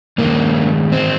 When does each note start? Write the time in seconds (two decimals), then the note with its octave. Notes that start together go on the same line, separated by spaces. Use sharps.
0.18 G2 D#3 A#3
0.92 C4